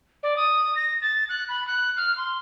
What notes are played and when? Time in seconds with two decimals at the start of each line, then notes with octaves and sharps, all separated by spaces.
0.23 D5
0.37 D#6
0.76 A#6
1.02 A6
1.29 F#6
1.49 B5
1.68 F#6
1.97 F6
2.17 C6